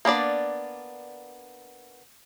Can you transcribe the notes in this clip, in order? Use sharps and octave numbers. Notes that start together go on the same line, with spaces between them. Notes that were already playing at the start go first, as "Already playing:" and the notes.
A#3 B3 D4 D5